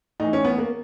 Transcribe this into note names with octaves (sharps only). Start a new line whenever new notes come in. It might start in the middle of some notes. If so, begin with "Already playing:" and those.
A2 E3 D#4
C#4
B3
A#3